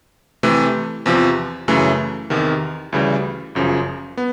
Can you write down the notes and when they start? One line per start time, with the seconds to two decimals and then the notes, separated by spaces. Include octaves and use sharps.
0.43 C3 E3 A3
1.06 E2 C3 F3
1.68 F#2 C#3 E3 A3
2.30 E2 C3 D#3
2.92 D2 C#3 E3 G3
3.55 G1 F#2 C#3 F3
4.17 B3